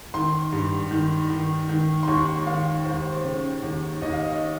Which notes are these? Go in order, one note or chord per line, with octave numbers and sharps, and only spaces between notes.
D#3 C6
G2
D#3
D#3
D#3
C6
D#2 C#6
D#3 F5
D#2 C5
C#3
D#2
D#2 D#5
F5
D#5